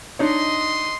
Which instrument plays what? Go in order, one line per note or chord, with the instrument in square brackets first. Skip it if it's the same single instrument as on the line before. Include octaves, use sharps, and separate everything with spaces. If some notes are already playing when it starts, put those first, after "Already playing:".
[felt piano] D4 D#4 C#5 [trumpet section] D#5 C6